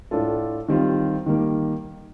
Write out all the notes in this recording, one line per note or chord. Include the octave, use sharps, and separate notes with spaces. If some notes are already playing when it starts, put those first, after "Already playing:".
A2 A3 D4 F4 A4
D#3 G3 C4 F4
D#3 G3 A#3